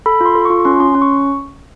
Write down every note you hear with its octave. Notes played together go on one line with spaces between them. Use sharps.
A4 B5
F4
C6
A4
C#6
F4
C#4 C6
C#4 C6
C#4
C#6